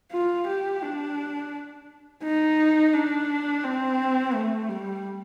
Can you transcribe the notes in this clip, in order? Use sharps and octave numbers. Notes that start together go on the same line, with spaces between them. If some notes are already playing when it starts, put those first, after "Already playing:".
F4
G4
D4
D#4
D4
C4
A3
G3